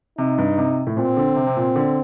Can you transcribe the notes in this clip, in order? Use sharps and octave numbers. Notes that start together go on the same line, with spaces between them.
C3 D#4
G2
C3
A2
A#2 C4
D3
C3
C3
A#2
D3